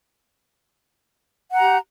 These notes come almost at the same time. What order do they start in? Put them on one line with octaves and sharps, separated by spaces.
F#5 A#5 G4